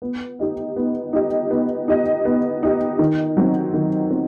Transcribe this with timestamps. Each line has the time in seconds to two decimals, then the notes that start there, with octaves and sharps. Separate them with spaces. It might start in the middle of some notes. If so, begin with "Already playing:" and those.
0.02 B3
0.39 D#4 G4 D#5
0.76 B3
1.13 D#4 G4 D#5
1.51 B3
1.88 D#4 G4 D#5
2.25 B3
2.63 D#4 G4 D#5
2.99 D#3
3.37 F#3 C4
3.74 D#3
4.11 C4